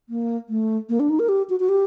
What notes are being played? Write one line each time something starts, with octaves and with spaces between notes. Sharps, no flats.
A#3
A3
A#3
D4
D#4
A#4
G4
F#4
F#4
G4